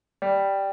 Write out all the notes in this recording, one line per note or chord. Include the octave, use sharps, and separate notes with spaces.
G3